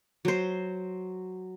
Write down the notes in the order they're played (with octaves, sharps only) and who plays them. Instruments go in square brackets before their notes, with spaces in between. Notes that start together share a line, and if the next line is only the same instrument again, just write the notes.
[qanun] F#3 C5